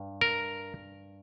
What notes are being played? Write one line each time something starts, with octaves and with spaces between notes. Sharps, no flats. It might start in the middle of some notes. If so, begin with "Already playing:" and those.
Already playing: G2
A#4